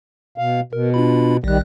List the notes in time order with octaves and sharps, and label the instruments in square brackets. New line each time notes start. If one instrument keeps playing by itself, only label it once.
[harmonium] B2 F5
[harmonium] B2 [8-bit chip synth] A#4
[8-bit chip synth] D4 F4 B5
[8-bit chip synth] A#1 F#6 [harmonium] D#3 G3